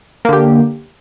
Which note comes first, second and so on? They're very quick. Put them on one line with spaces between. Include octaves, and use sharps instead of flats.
A#3 D3 G4